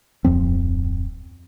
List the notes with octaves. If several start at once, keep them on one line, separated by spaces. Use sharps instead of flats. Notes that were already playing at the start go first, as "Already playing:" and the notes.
D1 F2 F3 C4